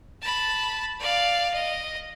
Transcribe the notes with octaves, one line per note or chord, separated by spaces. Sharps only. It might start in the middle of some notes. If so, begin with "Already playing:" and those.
A5 B5
D5 F5
D#5